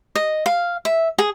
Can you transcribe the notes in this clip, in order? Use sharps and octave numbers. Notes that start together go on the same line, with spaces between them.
D#5
F5
E5
G#4